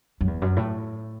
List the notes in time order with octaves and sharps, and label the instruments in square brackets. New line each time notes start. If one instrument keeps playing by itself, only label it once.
[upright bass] F#2
E2
F#2
A2